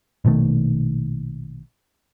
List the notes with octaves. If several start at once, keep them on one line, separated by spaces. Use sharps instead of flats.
A#1 B2 D#3 A3